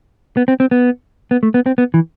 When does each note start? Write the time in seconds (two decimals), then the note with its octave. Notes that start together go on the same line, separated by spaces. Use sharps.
0.37 B3
0.48 C4
0.60 C4
0.71 B3
1.31 B3
1.43 A3
1.54 B3
1.66 C4
1.78 B3
1.94 E3